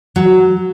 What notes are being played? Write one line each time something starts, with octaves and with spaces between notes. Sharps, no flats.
F#3